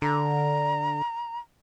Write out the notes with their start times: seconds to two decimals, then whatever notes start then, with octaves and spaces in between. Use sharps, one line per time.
0.02 D3 A#5